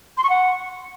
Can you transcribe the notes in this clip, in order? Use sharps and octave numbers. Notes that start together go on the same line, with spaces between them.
C6
C#6
F#5